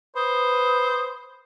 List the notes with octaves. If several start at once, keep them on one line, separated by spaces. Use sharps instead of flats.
B4 C5 D#6